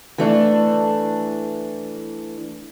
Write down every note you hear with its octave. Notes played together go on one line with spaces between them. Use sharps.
E3 A3 D4